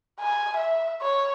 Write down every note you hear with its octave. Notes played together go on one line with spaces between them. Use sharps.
G#5
E5
C#5